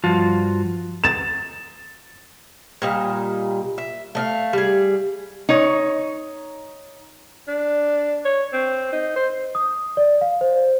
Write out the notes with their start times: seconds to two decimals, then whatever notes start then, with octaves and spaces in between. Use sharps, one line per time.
0.04 G2 F3 F4 F#4 A5
1.04 A6 E7
2.82 A#2 G3 D#5
3.78 E5
4.15 A3 D#5 F5
4.53 G3 G#4
5.49 D#4 C#5
7.48 D4
8.25 C#5
8.53 C4
8.93 D#4
9.16 C5
9.55 D#6
9.97 D5
10.21 F5
10.41 C5